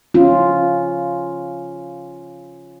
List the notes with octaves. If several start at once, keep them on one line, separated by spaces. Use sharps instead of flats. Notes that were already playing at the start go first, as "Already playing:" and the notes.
C#4 F4